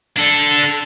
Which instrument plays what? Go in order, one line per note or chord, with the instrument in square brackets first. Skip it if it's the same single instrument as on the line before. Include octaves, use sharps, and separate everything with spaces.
[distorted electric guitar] D4 A4